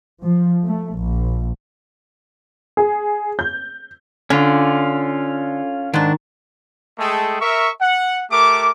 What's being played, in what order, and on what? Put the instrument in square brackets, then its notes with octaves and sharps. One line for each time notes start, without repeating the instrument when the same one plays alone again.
[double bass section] F3
A3
A#1
[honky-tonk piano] G#4
G6
[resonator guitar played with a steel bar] D3 [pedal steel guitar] C#4 F4
[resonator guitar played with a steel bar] G#2 D4 [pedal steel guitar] D#3
[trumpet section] G#3 A3 G#4 A4 G5 A5
A#4 E5 C#6
F#5
A3 G4 A#4 D6